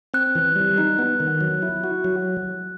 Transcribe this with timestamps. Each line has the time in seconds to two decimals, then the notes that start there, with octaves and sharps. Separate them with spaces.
0.14 C4 F#6
0.35 E3
0.56 G3
0.78 D#4
0.99 B3
1.20 D#3
1.41 F#3
1.62 E4
1.84 F#4
2.05 F#3